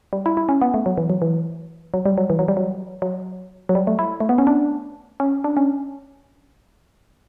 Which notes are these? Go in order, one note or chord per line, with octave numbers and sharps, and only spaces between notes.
G3
E4
E4
C#4
B3
A3
F#3
E3
F#3
E3
F#3
G3
F#3
E3
F#3
G3
F#3
F#3
F#3
G3
A3
E4
A3
B3
C#4
D4
C#4
D4
C#4